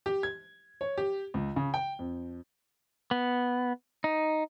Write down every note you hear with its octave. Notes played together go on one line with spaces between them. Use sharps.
G4
G#6
C#5
G4
C#2
C#3
G5
F2
B3
D#4